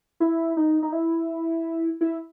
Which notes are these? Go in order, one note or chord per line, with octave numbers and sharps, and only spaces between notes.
E4
D#4
D#4
E4
E4